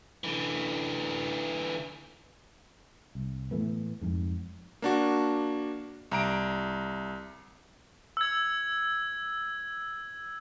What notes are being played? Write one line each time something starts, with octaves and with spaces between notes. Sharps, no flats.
D3 E3
C2
A2 E3 A3 B3
F2 G#2
A#3 D4 F#4
C2 A#5 D7
E6 G#6